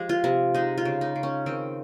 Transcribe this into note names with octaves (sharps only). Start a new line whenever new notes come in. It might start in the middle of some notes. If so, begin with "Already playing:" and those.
Already playing: F3 G#3 G4
F4
C3
G#3 D#4
F4
C#3
D#4
C#3
C#4
D#3 C4